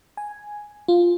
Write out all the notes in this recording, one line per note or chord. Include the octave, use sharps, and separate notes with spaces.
G#5
F4